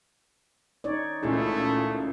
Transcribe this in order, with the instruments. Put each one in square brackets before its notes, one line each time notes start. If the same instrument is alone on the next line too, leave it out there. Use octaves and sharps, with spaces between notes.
[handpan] D#4 C#5 D5
[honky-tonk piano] C#2 A#2 C#3 [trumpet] A3 [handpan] E4 G#4